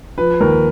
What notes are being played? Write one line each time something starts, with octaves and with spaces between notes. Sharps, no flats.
F3 B4
D#2 A#4